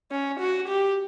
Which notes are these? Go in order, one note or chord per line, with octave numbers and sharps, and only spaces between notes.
C#4
F#4
G4